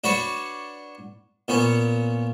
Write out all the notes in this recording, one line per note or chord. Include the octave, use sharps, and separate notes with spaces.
D4 F#4 B4 C#5
A#2 B3 C#4